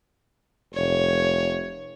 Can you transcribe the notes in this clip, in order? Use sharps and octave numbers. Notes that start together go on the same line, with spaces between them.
F1 C#5